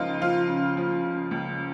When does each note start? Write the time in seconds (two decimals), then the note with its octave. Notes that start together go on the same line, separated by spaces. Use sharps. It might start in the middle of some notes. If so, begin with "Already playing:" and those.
Already playing: C#2 C#3 F3 D#4 F4 A#4
0.21 F3 F4
0.48 C#3
0.77 F3
1.04 C#3
1.31 C#2